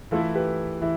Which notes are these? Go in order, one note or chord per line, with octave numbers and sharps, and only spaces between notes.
E3 A3 E4 F4 A4
G4 B4
E3 E4